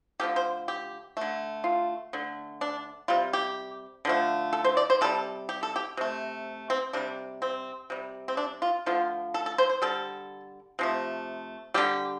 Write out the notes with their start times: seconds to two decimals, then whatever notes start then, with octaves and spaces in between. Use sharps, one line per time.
0.20 D3 F3 A3 G4
0.36 C5
0.68 G4
1.17 D3 A3
1.64 F4
2.13 D3 A3
2.61 D4
3.08 C3 G3 F4
3.33 G4
4.05 D3 F3 A3
4.53 A4
4.64 C5
4.77 D5
4.90 C5
5.01 C3 G3 A4
5.49 G4
5.63 A4
5.76 G4
5.97 C3 A3
6.70 C4
6.93 C3 G3 D4
7.42 C4
7.90 C3 G3
8.28 C4
8.37 D4
8.62 F4
8.86 D3 F3 A3 F4
9.34 A4
9.46 A4
9.58 C5
9.70 C5
9.82 D3 G3 A4
10.79 C3 F3 A3
11.74 D3 G3 G4